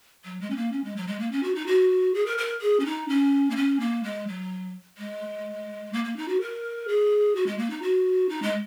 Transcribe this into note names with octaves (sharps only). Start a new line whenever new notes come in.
F#3
G#3
C#4
A#3
C#4
G#3
F#3
G#3
A#3
C#4
F#4
D#4
F#4
G#4
A#4
A#4
G#4
C#4
D#4
C#4
A#3
C#4
A#3
G#3
F#3
G#3
A#3
A#3
D#4
F#4
A#4
G#4
F#4
G#3
A#3
D#4
F#4
D#4
G#3